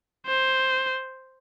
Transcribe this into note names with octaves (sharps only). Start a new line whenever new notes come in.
C5